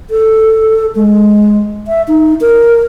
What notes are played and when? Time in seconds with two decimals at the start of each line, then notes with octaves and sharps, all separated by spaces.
0.10 A4
0.95 G#3
1.88 E5
2.08 D#4
2.41 A#4